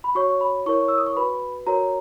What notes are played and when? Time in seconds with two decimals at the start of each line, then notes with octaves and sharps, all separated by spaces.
0.04 B5
0.15 F#4 C#5 C#6
0.41 B5
0.66 E4 A#4 C#5 C#6
0.88 E6
0.98 D#6
1.07 C#6
1.16 F#4 B4 B5
1.67 F#4 A#4 C#5 A#5